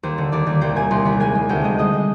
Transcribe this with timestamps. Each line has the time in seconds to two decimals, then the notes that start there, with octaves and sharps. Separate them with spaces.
0.03 D#2 C5
0.18 D3
0.32 D#2 D5
0.47 D#2
0.61 C2 C5
0.76 C3 G#5
0.91 C2 C6
1.05 C2 B5
1.20 G#3 G#5
1.35 G#3
1.49 D2 G5
1.64 G#3 D#5
1.79 G#3 D#5
1.93 G#3